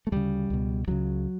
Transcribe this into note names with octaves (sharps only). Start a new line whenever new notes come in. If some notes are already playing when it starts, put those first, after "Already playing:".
A3
D2 C#3 E3 G3
C#2 B2
C#2 C#3 D3 F#3